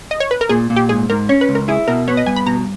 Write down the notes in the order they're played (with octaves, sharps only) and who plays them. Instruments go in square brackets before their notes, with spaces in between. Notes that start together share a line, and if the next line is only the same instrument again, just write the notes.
[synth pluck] D#5
C#5
B4
A#4
[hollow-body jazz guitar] A#2 [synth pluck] G#4
[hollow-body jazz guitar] A#2
[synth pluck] G4
[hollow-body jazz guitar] G#2 [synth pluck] G#4
[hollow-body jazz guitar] G#2 [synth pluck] A#4
[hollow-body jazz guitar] C#4 [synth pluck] C#5
[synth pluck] B4
[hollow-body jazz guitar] C#2
[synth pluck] A#4
[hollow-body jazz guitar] E4 [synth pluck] G#4
[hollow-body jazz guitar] B2 [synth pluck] A#4
[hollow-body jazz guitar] B3 [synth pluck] C#5
[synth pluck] D#5
[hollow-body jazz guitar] G2 [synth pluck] G#5
[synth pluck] B5
[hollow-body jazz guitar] B2 [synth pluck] A#5